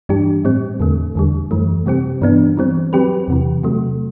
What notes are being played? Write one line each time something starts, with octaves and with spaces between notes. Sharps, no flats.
G2 E3 G3 D4 G4
A2 G3 C4
E2 D3 A3
E2 D3 G3
F#2 E3 A3
C3 G3 C4 G4
G2 E3 B3 D4
E3 G3 C4
F#3 C4 G4 B4
E2 C3 E3
C3 F#3 A3